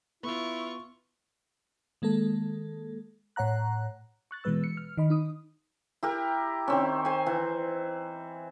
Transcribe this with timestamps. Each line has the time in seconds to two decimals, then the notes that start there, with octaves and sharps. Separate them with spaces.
0.23 B3 E4 F4 C#6
2.02 D#3 G#3 A#3 A4
3.36 A2 C#5 F#5 A#5 F#6
4.31 C#6 F#6 A6
4.44 B2 E3 G#3 B4 E6
4.64 C#7
4.77 F6
4.97 D#3 D#5 B5
5.10 D#4 D#6
6.03 E4 G4 A#4
6.68 D#3 C4 C#4
7.05 C5 G#5
7.26 E3